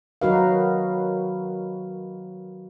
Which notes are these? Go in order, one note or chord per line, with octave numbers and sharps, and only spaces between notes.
D#3 F#3 D#4 F#4 B4 F5